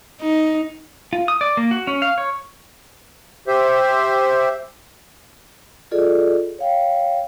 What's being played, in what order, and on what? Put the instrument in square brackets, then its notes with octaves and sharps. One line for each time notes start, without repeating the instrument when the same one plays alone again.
[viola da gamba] D#4
[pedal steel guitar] F4
D#6
D5
A#3
F#4
C#4
F5
C#5
[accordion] G4 C5 E5
[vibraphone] F4 G#4 A4 D5 D#5
C#5 F5 G5